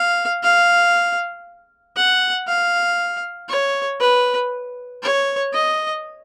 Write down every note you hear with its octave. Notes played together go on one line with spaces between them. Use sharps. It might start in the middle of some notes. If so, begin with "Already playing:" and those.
Already playing: F5
F5
F#5
F5
C#5
B4
C#5
D#5